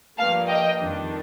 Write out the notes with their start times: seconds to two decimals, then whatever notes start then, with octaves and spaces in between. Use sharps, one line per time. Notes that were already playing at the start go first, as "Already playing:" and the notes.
0.17 G2 F3 A#3 F5 A5
0.48 D#5 G5
0.79 F2 D#3 G3 D4